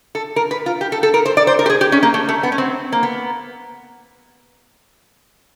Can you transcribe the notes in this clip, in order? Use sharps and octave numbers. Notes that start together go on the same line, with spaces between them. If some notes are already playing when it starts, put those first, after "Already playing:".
A4
A#4
B4
F4
G4
A4
A4
A#4
C5
D5
C5
A#4
G4
G#4
G4
C#4
A#3
A3
A3
B3
C#4
C4
A#3
B3